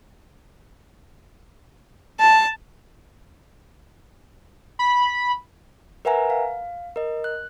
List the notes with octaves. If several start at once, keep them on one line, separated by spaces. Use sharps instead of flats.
A5
B5
A#4 B4 E5 F#5 G#5 A#5
F5
A#4 D#5
F#6